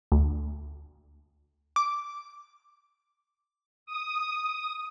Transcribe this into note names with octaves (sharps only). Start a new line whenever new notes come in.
D2
D6
D#6